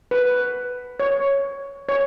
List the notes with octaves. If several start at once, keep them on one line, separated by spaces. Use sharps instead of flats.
B4
C#5
C#5